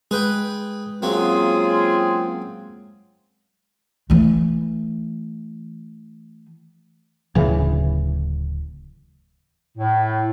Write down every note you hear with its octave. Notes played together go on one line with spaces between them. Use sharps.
G#3 G#4 B4 G5
F#3 A#3 C4 C#4 F4 G#4
E3 A3
D1 C#3 E3
A2